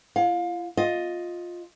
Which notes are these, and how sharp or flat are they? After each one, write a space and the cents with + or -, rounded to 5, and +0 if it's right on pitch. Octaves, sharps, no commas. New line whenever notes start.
F4 -45 F5 +25
F4 +10 D#5 +5